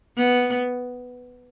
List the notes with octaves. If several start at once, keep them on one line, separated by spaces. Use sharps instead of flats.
B3